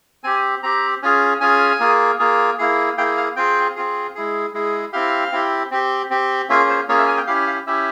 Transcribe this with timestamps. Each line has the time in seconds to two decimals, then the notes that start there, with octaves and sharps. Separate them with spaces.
0.24 C4 G4 G#5
0.63 C4 G4 A#5
1.02 C#4 F4 G#4
1.41 C#4 F4 G#4 G#5
1.80 A#3 F4 G#4
2.19 A#3 F4 G#4
2.59 A#3 E4 G#4
2.97 A#3 E4 G#4 G5
3.17 F5
3.36 C4 F4 G#4 G5
3.76 C4 F4 G#4
4.15 G#3 E4 G#4
4.54 G#3 E4 G#4
4.93 C4 E4 G4 F5
5.32 C4 E4 G4
5.71 C4 G4
6.10 C4 G4
6.49 A#3 C#4 F4 G#4 E5
6.69 C5
6.89 A#3 C#4 F4 G#4 C#5
6.98 E5
7.08 G#5
7.17 G5
7.27 C#4 E4 G4 F5
7.47 F5
7.67 C#4 E4 G4 E5